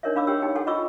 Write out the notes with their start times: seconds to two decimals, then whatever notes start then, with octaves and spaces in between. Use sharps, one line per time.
0.03 D4 D#4 A#4 C#5 D#5 E5
0.15 D4 F5 B5 D6 E6
0.27 G4 C#5 G5 E6
0.42 D#4 G4 G5
0.55 G4 A4 F#5 G#5
0.67 F4 D#5 B5 C#6 D6 E6